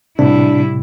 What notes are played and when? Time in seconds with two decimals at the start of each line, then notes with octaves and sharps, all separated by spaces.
0.19 A2 C3 G3 D4 E4